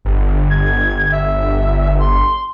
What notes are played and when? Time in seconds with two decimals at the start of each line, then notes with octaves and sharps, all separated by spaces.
0.05 G1
0.50 G#6
1.12 E5
1.99 C6